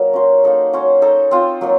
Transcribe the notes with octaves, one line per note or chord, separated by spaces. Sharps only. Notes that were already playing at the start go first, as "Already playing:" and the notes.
Already playing: F#3 A#3 D#4 A#4
C#4 F#4 C5
A#3 D#4 A4
C#4 F#4 C5
D#4 A4 D#5
C4 F4 C5
F#3 A#3 D#4